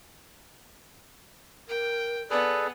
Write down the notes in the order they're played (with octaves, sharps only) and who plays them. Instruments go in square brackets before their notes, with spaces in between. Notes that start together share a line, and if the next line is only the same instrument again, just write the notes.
[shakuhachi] A#4 [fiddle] G5
[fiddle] B3 [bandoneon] G#4 A4 B4 [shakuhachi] D5